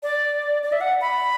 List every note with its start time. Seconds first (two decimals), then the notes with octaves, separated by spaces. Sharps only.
0.03 D5
0.63 D5
0.72 E5
0.81 F#5
1.01 B5